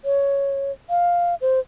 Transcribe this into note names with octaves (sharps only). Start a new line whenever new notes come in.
C#5
F5
C5